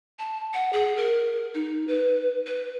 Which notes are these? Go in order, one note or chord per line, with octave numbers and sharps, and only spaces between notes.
A5
F#5
G#4
A#4
D#4
B4
B4